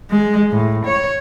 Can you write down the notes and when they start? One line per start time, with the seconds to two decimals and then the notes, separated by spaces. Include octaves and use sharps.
0.11 G#3
0.52 A2
0.86 C#5